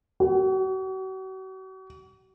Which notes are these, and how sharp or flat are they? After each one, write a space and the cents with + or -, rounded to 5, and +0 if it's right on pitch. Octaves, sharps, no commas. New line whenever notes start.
F#4 +40